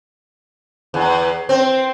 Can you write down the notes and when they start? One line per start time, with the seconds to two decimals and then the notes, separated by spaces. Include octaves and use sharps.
0.94 E2
1.49 C4